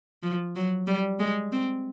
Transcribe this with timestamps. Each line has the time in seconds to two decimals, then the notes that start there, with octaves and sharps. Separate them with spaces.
0.23 F3
0.56 F#3
0.87 G3
1.19 G#3
1.52 C4